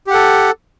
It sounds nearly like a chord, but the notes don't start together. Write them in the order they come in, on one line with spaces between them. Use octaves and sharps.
G4 F#5 A4